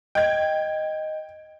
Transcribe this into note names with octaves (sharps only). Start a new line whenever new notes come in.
D#5 G5 G#6